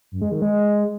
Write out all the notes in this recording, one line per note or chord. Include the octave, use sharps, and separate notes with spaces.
F#2
G#3
D#3
G#3